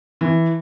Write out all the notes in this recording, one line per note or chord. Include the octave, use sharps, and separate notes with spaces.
E3